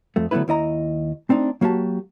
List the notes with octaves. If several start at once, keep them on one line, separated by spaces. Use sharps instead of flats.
F2 A3
D3 F#3 A3 B3 E4 B4
D#2 E4 D#5 A#5
A3 C4 D4 D#4
F#3 A#3 F#4 G4 A5